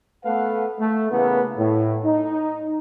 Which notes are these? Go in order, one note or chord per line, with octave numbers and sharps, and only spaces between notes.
A3 B3 A4 B4 F5 F#5
A3
C#3 E3 A#3 B3
A2
D#4